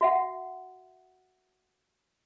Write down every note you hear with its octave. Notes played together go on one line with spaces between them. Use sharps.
F#4 E5 F#5